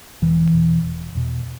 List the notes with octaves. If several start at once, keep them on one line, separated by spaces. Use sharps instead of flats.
E1 E3
E2 B2
E1
E2 B2